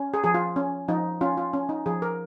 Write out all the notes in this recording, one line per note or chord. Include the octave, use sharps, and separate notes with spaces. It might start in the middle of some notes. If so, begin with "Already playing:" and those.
Already playing: C#4
G#4
F3 G#4
F4
C#4
F3 D#4
C#4 F4
F4
C#4
D#4
F3 G#4
A#4